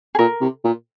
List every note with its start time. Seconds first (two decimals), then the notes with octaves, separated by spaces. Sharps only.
0.15 G#4
0.19 A#2 A#4
0.41 C3
0.64 A#2